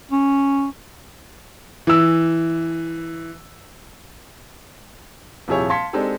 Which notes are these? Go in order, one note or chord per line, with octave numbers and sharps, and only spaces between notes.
C#4
E3 E6
D#1 C3 F3 E4 G#4 C#5
F5 A5 C6 G#6 B6 C#7
G#3 C4 D4 D#4 G4 A4